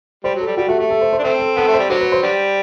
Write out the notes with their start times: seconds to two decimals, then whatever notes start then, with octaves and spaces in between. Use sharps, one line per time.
0.24 G3 C5
0.35 F#3
0.41 A4
0.47 G3
0.57 G3 F#4
0.68 A3 F#4
0.79 A3 G4
0.90 A4
1.01 C5
1.13 C5
1.19 D4
1.23 A3 C4 A4
1.40 A4
1.56 B3 A4
1.68 A3
1.74 G3 C5
1.89 D3 F#3 C5
2.01 B4
2.12 C5
2.23 D3 G3